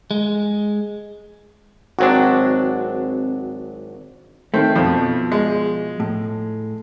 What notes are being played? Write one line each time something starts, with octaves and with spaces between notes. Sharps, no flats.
G#3
G#1 F#3 C4 D4 F#4
D#3 A3 C4
F2 B2 F3
G#3
A2